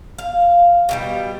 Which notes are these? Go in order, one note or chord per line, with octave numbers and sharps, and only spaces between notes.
F5
B2 D#3 G3